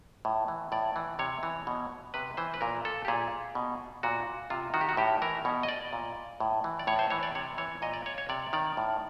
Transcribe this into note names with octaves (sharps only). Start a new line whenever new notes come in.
A2
E3
A2 D5
E3
C3 C#5
E3
B2
C3 B4
E3 C5
B4
A#2 A#4
A4
G4
A#2 G#4
B2
A#2 F#4
C3 F4
D#3 F#4
G4
F#4
A2 G4
E3 A#4
B2 C#5
D#5
D5
A#2
A2
E3
D5
A2 C#5
C5
E3 C#5
D5
C3 C#5
E3 C#5
A#2 D#5
D5
C#5
C#5
C3 D5
D#3 D5
A2